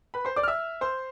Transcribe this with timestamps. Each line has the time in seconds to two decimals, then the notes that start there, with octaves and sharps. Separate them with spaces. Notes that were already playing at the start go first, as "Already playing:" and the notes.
0.14 B4 B5
0.25 C5 C6
0.36 D5 D6
0.43 F6
0.48 E5 E6
0.81 C5 C6